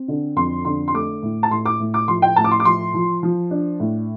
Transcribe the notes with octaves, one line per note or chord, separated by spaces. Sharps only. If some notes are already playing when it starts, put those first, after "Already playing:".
Already playing: C4
D3
F2 C6
D3 C6
C6
A3 D6
A2
A5
A2 C6
D6
A2
D6
F3 C6
G5
A2 A5
D6
C6
D6
F3 C6
F3
F3
D4
A2